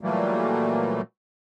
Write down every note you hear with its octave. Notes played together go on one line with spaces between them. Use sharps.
A#2 E3 F#3 G3 A3 A#3